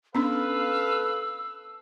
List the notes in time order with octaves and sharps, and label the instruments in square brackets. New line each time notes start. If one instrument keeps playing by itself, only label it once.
[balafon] B3 C#4 D4 [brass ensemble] A4 B4 F5 [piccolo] E6